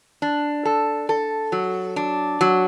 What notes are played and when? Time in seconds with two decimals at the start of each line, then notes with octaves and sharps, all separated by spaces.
0.22 D4
0.65 A4
1.09 A4
1.52 F#3
1.96 D4
2.41 F#3